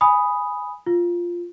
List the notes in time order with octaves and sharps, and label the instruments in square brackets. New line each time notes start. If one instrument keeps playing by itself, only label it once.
[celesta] G#5 B5 D#6
F4